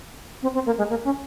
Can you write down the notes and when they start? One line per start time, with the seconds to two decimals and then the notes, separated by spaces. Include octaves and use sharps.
0.42 C4
0.54 C4
0.66 A#3
0.78 G#3
0.90 A#3
1.04 C#4